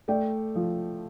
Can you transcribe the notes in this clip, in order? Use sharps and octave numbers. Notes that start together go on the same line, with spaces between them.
A3 D5 G5
F3